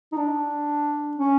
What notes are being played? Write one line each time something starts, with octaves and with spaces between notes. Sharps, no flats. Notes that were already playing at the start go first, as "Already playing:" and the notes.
D#4
D4
C#4